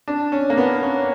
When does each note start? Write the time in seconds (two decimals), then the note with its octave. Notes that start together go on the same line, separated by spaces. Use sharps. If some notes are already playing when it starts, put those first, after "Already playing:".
0.08 D4
0.32 C#4
0.50 A#3
0.57 B3
0.83 C#4